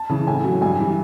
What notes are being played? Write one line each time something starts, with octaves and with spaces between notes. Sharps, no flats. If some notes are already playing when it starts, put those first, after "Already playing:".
Already playing: A5
C#3 E3
A2 G#5
F#3
G2 G#5
E3 G3